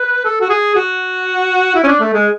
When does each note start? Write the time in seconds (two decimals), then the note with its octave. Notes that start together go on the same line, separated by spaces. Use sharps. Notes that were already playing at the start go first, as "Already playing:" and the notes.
Already playing: B4
0.25 A4
0.41 F#4
0.49 G#4
0.75 F#4
1.75 E4
1.84 C#4
1.88 D4
2.00 A3
2.13 G#3